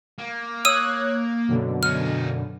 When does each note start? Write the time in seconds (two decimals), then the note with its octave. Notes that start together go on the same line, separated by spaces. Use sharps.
0.18 A#3
0.65 C#5 D#6 E6 F#6 G#6 D#7
1.48 F#2 B2 D3
1.83 C#4 D#4 F6